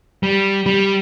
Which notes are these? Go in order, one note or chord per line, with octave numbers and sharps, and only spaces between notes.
G3
G3